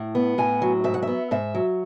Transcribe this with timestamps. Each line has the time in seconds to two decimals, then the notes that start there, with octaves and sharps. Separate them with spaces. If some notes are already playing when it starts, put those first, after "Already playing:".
Already playing: A2
0.15 B3
0.38 A2 G#5
0.62 F#3
0.84 G#2 E5
0.94 F#5
1.02 B3 E5
1.31 G#2 E5
1.55 F#3